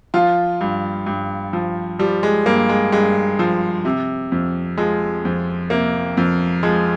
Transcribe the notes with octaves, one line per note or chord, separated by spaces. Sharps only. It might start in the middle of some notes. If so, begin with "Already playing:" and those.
F3 F4
G2
G2
F3
F3 G3
G#3
G2 A#3
G#3
G2 G#3
F3
C3
F2
F3 G#3
F2
C3 A#3
F2
F3 G#3